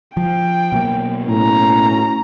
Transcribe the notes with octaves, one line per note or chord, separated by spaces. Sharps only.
F3 G5
B2 F#3 A#3
A2 C#4 A#5